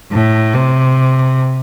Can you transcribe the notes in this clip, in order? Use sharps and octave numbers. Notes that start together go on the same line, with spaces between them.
A2
C3